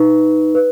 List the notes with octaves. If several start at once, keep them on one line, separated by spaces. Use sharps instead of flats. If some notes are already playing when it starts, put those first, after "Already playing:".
Already playing: D#4 B4
B4